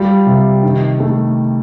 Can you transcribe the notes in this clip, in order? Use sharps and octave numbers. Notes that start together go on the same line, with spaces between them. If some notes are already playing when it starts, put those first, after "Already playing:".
Already playing: G3 F4
C3
D#3
A3